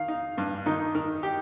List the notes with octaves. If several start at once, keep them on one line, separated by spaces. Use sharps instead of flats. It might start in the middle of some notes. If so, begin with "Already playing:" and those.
Already playing: D#3 F5
D#4
G2
D#3 D#4
D#3
G4